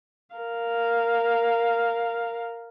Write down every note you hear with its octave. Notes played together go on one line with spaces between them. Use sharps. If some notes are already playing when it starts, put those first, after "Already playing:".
A#4 F5